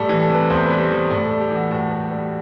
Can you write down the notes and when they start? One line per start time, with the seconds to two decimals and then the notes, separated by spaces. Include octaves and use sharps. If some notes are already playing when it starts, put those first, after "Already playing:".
Already playing: A2 G3 A4
0.09 E3
0.20 A4
0.29 C3 B4
0.50 E2 C5
0.65 G3 B4
0.80 C5
0.90 E3
1.10 A2 D5
1.25 A4
1.30 G3
1.41 G4
1.51 E3 F#4
1.71 A2 F#4
1.92 A2
2.11 G3